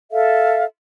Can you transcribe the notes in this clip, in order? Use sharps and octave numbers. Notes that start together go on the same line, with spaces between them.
A4 E5 F5